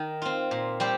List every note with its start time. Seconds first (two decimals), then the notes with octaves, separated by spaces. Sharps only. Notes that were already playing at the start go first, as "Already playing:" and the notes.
Already playing: D#3
0.22 C4 F4
0.51 A#2
0.80 G3 C4 G4